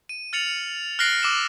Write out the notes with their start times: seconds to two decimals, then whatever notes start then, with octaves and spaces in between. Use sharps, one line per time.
0.09 D#7
0.33 F6 A6 C#7 F7 F#7
0.99 F6 F#6 A#6 C7 D7
1.23 D6 E6 C7 E7